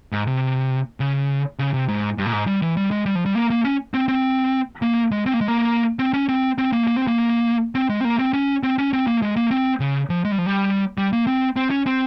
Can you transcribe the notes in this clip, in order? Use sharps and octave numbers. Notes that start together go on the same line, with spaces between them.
G#2
C3
C#3
C#3
C3
G#2
G2
A#2
G#2
G3
E3
G3
G#3
G3
F3
G3
A#3
A#3
C#4
C4
C4
A#3
G#3
C4
A#3
G#3
A#3
C4
C#4
C4
C4
A#3
A#3
C4
A#3
C4
G#3
C4
A#3
C4
C#4
C4
C#4
C4
A#3
G#3
A#3
C4
C#3
F3
G#3
G3
F3
G3
G3
A#3
C4
C4
C#4
C4